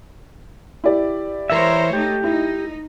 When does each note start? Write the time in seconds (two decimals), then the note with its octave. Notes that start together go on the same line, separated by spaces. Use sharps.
0.84 E4 G4 D5
1.50 E3 A#4 C5 C#5 E5
1.93 A3 D#4 G4
2.24 D#4 E4